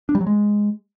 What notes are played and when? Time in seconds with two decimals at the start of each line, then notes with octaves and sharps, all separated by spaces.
0.09 D4
0.15 G3
0.21 F#3
0.27 G#3